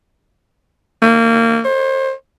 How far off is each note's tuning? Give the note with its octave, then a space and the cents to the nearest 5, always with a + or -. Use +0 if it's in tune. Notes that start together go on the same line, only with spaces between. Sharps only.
A#3 -25
C5 +30